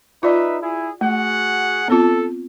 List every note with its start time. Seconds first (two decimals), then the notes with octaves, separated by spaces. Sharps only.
0.23 D#4 F4 B4 D5 E5
0.61 E4 G#4
1.01 A3 F#4 G#4 F#5
1.88 B3 C4 F4 A4